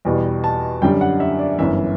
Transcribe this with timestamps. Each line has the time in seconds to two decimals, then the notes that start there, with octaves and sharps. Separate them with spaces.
0.05 E2 B2 G3
0.44 A5
0.82 F#2 D3 G3 G5
1.01 F#5
1.20 E5
1.39 D5
1.58 G1 F#2 E3 E5